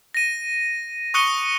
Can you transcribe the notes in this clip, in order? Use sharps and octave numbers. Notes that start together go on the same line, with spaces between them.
A#6 D#7
C#6 D#6 F#6 C#7 D#7 G7